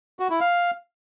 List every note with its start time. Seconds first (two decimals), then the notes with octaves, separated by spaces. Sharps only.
0.20 F#4
0.30 E4
0.40 F5